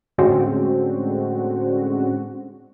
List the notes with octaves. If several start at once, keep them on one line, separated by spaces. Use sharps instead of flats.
A2 D3 G#3 C4 C#4 F#4